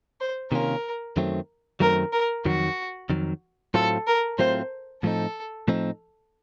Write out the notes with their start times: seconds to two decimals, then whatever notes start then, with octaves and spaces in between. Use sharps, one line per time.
0.21 C5
0.52 C3 D#3 A#3 C#4 F4 A#4
1.17 F#2 D#3 F#3 A3 C4
1.80 F#2 D#3 F#3 A3 C4 A#4
2.13 A#4
2.45 F2 D#3 F#3 F#4
3.10 F2 D#3 F#3
3.74 A2 F#3 A3 C4 F4 A4
4.07 A#4
4.39 A2 F#3 A3 C4 F4 C5
5.03 A2 F3 A3 C4 D#4 A4
5.68 A2 F3 A3 C4 D#4